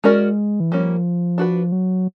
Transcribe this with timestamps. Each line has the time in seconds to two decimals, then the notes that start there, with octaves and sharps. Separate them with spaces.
0.04 G#3 C#4 F#4 A#4 D5
0.60 E3
0.71 F3 G3 A#3 C#4
1.38 D4 F#4 B4
1.72 F#3